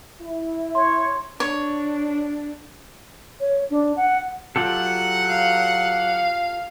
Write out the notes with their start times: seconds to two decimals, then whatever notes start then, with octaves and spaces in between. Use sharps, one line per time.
0.21 E4
0.75 C#5 C6
1.40 D4 C#5
3.40 C#5
3.71 D4
3.97 F#5
4.56 F#3 F4 G4 A4 F#5
5.29 F5